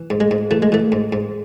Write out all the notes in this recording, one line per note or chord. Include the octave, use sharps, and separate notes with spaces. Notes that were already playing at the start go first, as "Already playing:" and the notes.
Already playing: E3
G#2
G#3
G#2
E3 A3
G#3
E3 A3
G#2
G#2